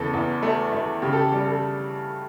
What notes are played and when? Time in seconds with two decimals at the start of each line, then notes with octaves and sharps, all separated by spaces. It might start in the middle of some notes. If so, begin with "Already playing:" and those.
Already playing: E2 C#3 A4
0.13 E2
0.43 A3
0.73 A3
1.02 C#3 G4
1.13 A4
1.17 G4
1.32 G3 G4
1.47 A4